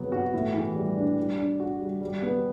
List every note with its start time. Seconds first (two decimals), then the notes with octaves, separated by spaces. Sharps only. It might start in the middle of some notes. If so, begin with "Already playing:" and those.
Already playing: C3 F#3 B3
0.12 F#4
0.34 A2
0.54 E3
0.75 G3
0.96 D4
1.17 G3
1.38 D4
1.60 F#4
1.81 G3
2.01 G3
2.22 B3